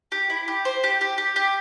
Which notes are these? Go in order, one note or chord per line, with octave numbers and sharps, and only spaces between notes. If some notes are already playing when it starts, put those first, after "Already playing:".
G4
E4
G4
C5
G4
G4
G4
G4